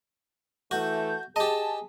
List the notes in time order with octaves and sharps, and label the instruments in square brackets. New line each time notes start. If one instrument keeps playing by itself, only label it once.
[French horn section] E3 A3 [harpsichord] F#4 [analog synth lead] G6
[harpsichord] G4 D#5 [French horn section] G#4 [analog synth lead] A5